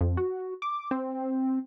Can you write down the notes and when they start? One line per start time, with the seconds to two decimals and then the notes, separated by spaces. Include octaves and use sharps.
0.01 F2
0.17 F#4
0.62 D6
0.91 C4